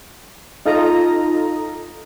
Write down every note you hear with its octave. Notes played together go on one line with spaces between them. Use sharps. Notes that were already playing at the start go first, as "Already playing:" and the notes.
D#4 F4 A4 D#5 A#5